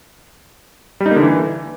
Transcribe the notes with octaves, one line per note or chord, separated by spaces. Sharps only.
G3
D#4
A#3
D3
E3